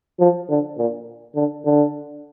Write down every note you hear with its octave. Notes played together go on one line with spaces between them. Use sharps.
F3
D3
A#2
D3
D3